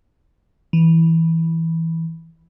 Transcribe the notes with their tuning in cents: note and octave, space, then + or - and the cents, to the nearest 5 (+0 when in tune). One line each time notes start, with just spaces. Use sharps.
E3 -10